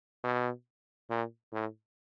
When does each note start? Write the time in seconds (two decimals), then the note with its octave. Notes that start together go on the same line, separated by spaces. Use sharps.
0.23 B2
1.10 A#2
1.52 A2